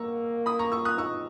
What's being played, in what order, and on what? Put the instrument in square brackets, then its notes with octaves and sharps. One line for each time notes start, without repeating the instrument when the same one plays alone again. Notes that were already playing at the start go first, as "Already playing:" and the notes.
Already playing: [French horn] A#3 [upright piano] A#5 C#6 E6
[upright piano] B5 D#6
A#5 C#6
C#6 E6
D#6 F#6
[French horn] D#4 [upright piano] C#6 E6